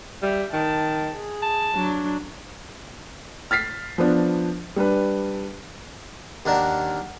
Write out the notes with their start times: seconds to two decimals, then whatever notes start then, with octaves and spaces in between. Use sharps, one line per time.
0.23 G3 E5
0.53 D#3 A5
1.12 G#4
1.43 A5
1.74 F#3 D4
3.51 F6 A6 B6 C7
3.98 F3 B3 D4
4.76 G3 D4 B4
6.46 D#2 D4 A#4 F#5 A5